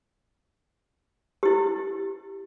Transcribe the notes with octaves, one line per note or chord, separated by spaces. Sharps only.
E4 G4